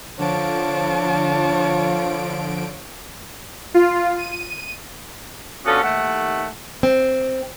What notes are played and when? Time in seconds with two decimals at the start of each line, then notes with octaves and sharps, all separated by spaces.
0.19 D3 F3 D4 F4 C#5 A5 D7
3.74 F4
4.18 D#7
5.66 D3 F3 B3 C#4 F#4 A4
5.83 D#2 A3 F#5
6.83 C4